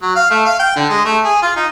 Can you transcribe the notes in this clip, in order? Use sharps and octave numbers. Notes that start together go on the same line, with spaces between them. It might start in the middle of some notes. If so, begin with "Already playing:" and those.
F#3
F5
A3
F5
G5
D3
G#3
A3
G#4
F4
D#4